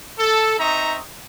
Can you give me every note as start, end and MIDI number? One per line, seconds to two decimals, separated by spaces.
0.18 0.55 69
0.59 1.00 60
0.59 1.00 63
0.59 1.00 76
0.59 1.00 82
0.59 1.00 85
0.59 1.00 87